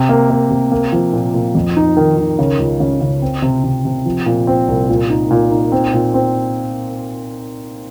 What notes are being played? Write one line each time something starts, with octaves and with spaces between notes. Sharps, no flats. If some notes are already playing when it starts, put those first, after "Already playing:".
Already playing: C3
A#3
A#3
C3
A#3
F3
A#2
A#2
F2
D#4
D#3
D#3
C#3
C#2
C#3
C#3
C4
C3
C3
C3
F3
A#2
C4
C2
A#2
D#4
A#2
D#4
C4
A#2
C4